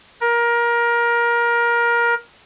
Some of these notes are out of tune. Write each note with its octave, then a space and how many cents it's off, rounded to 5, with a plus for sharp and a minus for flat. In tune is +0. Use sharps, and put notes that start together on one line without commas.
A#4 +20